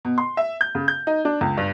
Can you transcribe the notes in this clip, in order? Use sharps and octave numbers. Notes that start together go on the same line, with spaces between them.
B2
C6
E5
G6
C#3
G6
D#4
D4
C#2
G2